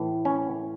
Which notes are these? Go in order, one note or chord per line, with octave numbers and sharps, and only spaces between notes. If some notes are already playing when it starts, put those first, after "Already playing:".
Already playing: A2 E3
C#4